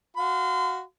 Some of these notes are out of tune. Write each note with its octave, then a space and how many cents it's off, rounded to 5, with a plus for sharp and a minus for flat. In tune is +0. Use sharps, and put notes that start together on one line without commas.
F#4 +0 F5 +0 C6 -35